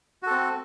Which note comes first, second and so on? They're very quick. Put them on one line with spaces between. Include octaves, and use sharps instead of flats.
F#4 A4 C4